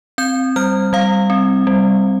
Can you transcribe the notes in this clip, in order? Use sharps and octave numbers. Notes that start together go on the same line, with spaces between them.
C4 G6
G3 F6
G3 F5
C4
G3